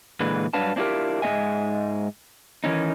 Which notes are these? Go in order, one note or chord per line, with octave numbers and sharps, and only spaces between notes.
A#2 D3 E3 G#3 B4
G2 F#3 D4 B4 F5 A5
C4 D4 E4 F4 G4 A#4
G#2 G#3 C4 D#5 E5 G#5
D#3 E3 C#4 D#4